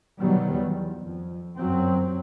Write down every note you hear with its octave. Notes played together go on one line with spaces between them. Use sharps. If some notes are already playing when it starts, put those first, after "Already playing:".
B2 D#3 F#3 G3 B3
E2
F2
G1 F#2 F#3 C4